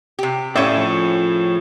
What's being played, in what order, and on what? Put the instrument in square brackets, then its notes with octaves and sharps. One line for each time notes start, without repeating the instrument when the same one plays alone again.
[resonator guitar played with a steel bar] C3 G4
[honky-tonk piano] A2 [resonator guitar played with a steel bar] C#4 E5 [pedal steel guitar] D5 F5 D6
[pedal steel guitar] F3 G#4 C#5